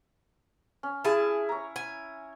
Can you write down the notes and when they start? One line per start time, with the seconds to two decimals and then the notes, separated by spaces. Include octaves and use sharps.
0.83 C#4
1.05 E4 G#4 G#5 A5
1.49 C#5 A#5
1.76 G#5